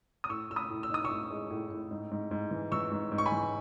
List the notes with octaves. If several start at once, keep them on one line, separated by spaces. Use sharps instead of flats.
D#6
A2 C#6 E6
A2 E6
B5 D#6
A2
E6
D#4 D#6
C#6 E6
A2
G#3
A2
A2
G#2
G#2
G#2
E3
E3 C#6 E6
G#2
G#2
C#6
G#5 B5
E3